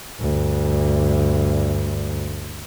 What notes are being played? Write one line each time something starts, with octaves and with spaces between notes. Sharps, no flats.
D2 G2